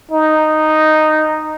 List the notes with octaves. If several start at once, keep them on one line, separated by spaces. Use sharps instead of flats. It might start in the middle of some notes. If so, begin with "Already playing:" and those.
D#4